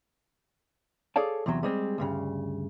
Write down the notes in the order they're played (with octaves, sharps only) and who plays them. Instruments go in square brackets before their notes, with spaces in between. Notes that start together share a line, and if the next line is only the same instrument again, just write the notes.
[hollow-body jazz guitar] G#4 A4 C#5 D5 F5 A5
E2 C3 E3 F#3
G3 G#3 C4
D2 G2 C#3